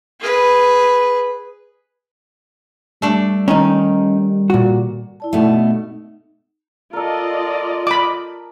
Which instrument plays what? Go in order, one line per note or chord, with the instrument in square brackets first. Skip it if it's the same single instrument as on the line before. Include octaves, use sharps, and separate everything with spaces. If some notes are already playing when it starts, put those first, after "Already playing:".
[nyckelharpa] G#4 B4
[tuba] G3 [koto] A3 D4
[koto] D#3 [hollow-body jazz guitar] C#4 D#4
[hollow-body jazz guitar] A#2 F#4
[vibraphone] E4 D5 A5
[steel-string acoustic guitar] B2 A3 [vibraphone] D#4
[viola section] F4 D5 D#5 [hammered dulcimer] A4 A#4
[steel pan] B5 D6